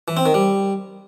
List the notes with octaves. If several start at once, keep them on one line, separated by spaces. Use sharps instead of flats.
E3
C4
D#3
G3